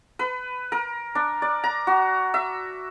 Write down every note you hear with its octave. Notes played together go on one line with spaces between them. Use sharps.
B4
A#4
D4
D5
A#5
F#4
E5